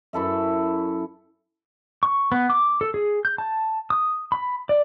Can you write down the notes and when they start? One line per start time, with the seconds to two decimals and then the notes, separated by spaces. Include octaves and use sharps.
0.13 F#2 E4 A4 E5
2.03 C#6
2.32 B3
2.50 D6
2.81 A4
2.94 G#4
3.25 G6
3.38 A5
3.90 D#6
4.32 B5
4.69 D5